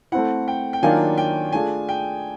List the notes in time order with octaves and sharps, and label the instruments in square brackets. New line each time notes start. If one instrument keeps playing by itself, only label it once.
[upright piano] A3 C4 E4 [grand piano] F#5
[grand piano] G5
G5
[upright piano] D#3 F#3 A#3 D4 F4 [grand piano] G#5
[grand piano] G5
[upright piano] A3 D4 F4 G#4 [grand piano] G#5
[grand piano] G5